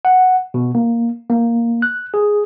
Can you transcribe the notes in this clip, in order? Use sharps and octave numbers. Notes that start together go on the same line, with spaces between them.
F#5
B2
A#3
A#3
F#6
G#4